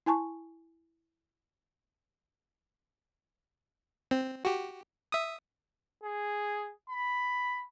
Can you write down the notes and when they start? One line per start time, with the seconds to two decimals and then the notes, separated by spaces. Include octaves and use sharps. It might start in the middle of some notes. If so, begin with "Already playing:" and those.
0.06 E4 G#5 A5 C#6
4.11 C4
4.45 F#4 G4
5.12 E5 D#6
6.03 G#4
6.90 B5